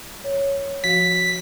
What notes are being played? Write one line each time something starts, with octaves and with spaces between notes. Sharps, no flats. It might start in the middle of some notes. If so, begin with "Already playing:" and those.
C#5
F3 F#4 B6